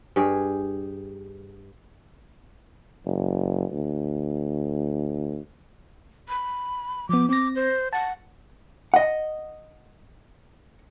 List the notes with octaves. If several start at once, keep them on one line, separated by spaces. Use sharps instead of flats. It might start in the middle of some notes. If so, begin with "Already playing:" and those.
G2 G4 G#4
F#1
D2
B5
F3 B3 D6
C4 D6 A#6
C5
F#5 A5
D#5 F#5